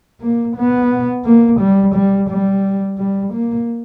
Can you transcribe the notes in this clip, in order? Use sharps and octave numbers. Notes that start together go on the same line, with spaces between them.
A#3
B3
A#3
G3
G3
G3
G3
A#3